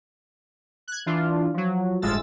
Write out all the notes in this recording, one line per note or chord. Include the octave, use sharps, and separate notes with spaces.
F#6 G#6
E3 D4 F4
F3 F#3
G1 A2 G#3 F4 E6 A6